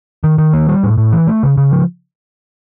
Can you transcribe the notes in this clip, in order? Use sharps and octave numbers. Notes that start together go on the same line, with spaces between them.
D#3
D#3
A#3
G3
A2
A2
E3
A3
C#3
C#3
F3